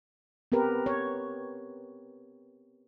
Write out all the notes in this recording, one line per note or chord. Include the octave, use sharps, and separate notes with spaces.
B3 C4 G4 A#4 B4
C#5